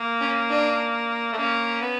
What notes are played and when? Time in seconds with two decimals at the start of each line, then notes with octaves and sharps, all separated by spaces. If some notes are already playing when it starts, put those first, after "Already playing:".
Already playing: A#3
0.21 C#4
0.49 D4
1.32 A3
1.37 A#3 C#4
1.81 B3